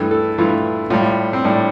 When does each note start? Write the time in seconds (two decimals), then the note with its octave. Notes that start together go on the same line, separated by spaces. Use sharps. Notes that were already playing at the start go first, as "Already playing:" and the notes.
Already playing: G2 E3 A3
0.11 A4
0.38 G2 E3 A3 F4
0.90 A2 G3 F4
1.33 C4
1.44 A2 G3 D4